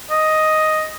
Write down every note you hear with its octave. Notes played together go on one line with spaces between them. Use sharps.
D#5